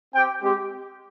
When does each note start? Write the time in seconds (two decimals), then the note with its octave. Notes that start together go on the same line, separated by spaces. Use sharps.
0.13 C4 G4 G5
0.42 G#3 C4 G4